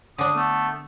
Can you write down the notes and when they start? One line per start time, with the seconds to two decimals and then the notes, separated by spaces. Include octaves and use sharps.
0.18 D3 D4 D#6
0.36 A3 B3